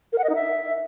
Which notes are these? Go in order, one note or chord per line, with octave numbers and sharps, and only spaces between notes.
A#4
F#5
D#5
D#4
E5